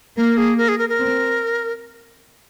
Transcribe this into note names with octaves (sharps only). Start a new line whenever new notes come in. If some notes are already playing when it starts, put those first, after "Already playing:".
A#3 A#4
G#4
A#4
G#4
A#4
A#4
C4